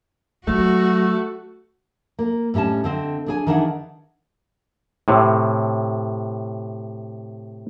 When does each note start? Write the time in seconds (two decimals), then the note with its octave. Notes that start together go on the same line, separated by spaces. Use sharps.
0.47 F#3 A3 F#4
2.19 A#3
2.54 A2 G3 C#4 D#5 A5
2.84 D3 C4 D#5
3.26 D4 G#4 G#5
3.47 D#3 E3 D4 D#4 G#4 F#5
5.08 A2 C3